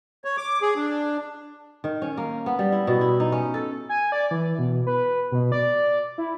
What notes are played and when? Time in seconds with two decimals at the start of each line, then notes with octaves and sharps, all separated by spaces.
0.24 C#5
0.37 D6
0.62 G#4
0.76 D4
1.84 D#3
2.02 C#4
2.17 A#3
2.46 B3
2.59 G3
2.72 E4
2.87 B2
3.01 E4
3.20 D#4
3.32 C#4
3.54 A4
3.89 G#5
4.12 D5
4.31 E3
4.59 B2
4.87 B4
5.32 B2
5.52 D5
6.18 E4